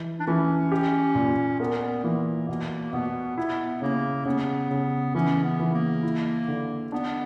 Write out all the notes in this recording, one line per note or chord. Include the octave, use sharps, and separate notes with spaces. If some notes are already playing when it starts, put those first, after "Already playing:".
Already playing: E3
D4
E3 C#4
G4
A#2
B3 A#4
E3 A#3
B2 A#3
B2 B3
B3 E4
C#3 A#3
C#3 B3
C#3
E3 C#4
B3
E3
A#3
E4
D3
B3 D4